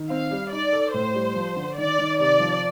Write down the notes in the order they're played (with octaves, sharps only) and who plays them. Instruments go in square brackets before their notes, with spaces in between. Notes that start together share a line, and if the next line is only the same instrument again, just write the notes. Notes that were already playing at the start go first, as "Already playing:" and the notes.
Already playing: [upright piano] D#3
[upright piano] C4 [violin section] F5
[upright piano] G3
[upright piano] D#4 [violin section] D5
[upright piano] A4
[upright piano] A2 [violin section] C5
[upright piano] G3
F3
D3
[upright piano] D#3 [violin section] D5
[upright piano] D#3
[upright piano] C3 [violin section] D5
[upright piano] F3